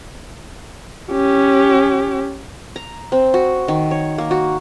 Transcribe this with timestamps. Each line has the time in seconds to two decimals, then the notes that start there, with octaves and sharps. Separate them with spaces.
1.11 C#4 G4
2.76 A#5
3.12 C4
3.34 F#4
3.68 D#3
3.91 C#5
4.18 A#3
4.31 F#4